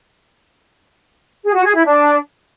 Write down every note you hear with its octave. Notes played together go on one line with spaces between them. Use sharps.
G#4
F#4
G#4
E4
D4